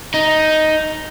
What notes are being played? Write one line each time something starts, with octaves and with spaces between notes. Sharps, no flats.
D#4